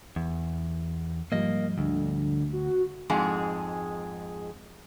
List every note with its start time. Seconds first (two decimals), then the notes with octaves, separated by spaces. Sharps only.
0.16 E2
1.32 G#2 F3 G3 A#3 D#5
1.78 D2 D3
2.53 F#4
3.10 F2 G#2 G#3 G#4